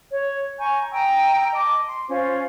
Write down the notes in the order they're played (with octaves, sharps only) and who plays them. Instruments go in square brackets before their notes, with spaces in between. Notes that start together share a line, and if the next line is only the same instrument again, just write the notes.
[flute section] C#5
G#5 A#5 C#6 G6
G5 A#5 D#6 E6
D#5 A5 D6
C6
C#4 F4 C5